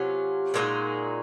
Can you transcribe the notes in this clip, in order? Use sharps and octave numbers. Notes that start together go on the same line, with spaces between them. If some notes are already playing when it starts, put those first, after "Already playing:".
Already playing: C3 F#3 C#4 F4
A#2 G#3 D#4 F#4